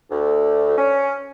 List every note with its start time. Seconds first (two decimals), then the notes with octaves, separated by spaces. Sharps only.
0.11 D2
0.78 C#4